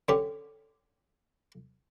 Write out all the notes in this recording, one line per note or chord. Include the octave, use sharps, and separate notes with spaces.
D3 C#4 G4